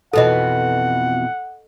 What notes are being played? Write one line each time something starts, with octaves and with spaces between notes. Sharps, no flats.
F2 B2 E3 A4 D#5 F#5